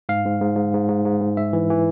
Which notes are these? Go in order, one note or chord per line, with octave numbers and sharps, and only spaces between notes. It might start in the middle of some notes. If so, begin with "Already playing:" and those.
G#2 F5
G#2
G#2
G#2
G#2
G#2
G#2
G#2
G#2 E5
E3
E3